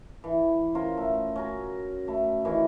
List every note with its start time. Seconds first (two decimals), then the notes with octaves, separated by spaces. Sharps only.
0.24 E3
0.74 C#4 F4 A#4 C5
0.97 A3
1.36 C#4 F#4 A#4
2.08 A3 B5
2.45 D#3 E3 C#4